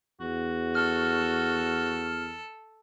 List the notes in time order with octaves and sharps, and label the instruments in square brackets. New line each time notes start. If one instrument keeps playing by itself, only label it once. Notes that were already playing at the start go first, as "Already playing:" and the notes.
[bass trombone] E2 [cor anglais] F#4
[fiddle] A4 [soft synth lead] F6